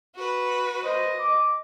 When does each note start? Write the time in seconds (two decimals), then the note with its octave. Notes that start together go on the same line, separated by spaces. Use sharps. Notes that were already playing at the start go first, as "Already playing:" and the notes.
0.15 F#4 B4
0.84 C5 D#5
1.19 D6